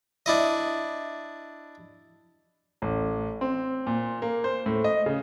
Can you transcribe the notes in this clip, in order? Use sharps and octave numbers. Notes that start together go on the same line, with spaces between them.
D4 E4 D#5
A1
C4
A#2
A#3
C5
A2
D#5
C#3